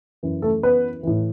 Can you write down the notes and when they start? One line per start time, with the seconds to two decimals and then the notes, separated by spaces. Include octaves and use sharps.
0.23 F#2 E3
0.42 A3 A4
0.63 B3 B4
1.03 A2 E3